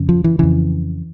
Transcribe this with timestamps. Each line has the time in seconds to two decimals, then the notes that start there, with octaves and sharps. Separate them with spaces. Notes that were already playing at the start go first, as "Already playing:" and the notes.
Already playing: F2 C#3
0.09 F3
0.24 E3
0.39 F2 C#3 E3